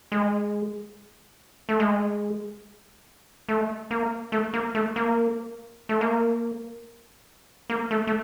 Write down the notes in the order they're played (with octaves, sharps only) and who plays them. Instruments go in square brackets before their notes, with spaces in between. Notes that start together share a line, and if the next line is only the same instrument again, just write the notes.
[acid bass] G#3
A3
G#3
A3
A#3
A3
A#3
A3
A#3
A3
A#3
A#3
A3
A3